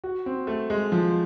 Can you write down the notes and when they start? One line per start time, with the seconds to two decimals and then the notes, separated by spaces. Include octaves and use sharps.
0.04 F#4
0.26 C4
0.47 A3
0.70 G#3
0.92 F3